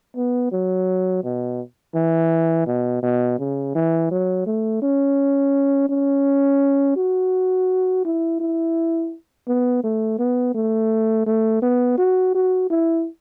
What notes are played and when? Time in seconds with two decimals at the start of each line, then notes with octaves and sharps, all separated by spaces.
0.16 B3
0.52 F#3
1.24 B2
1.95 E3
2.67 B2
3.03 B2
3.39 C#3
3.75 E3
4.11 F#3
4.46 A3
4.82 C#4
5.89 C#4
6.96 F#4
8.05 E4
8.40 E4
9.48 B3
9.84 A3
10.19 B3
10.55 A3
11.27 A3
11.62 B3
11.98 F#4
12.34 F#4
12.70 E4